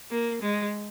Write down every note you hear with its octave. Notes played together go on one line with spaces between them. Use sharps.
A#3
G#3